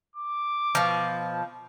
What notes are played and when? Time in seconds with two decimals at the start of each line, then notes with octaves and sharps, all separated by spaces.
0.16 D6
0.75 B2 F3